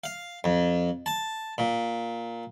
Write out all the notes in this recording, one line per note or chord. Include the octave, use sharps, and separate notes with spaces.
F5
F2
A5
A#2